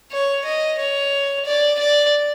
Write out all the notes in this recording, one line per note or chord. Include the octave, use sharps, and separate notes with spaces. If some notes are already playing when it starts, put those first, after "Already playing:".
C#5
D#5
C#5
D5
D5